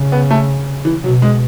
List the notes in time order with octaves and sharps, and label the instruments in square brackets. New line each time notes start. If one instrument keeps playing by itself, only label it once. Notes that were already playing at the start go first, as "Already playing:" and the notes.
Already playing: [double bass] C#3
[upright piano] B3
A3
E3
[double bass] B2 [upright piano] F#3
[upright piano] G#3